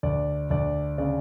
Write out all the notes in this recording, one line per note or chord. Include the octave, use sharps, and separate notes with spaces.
D2 D5
D2 D5
C#3 D5